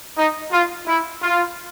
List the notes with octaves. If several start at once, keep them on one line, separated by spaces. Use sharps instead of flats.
D#4
F4
E4
F4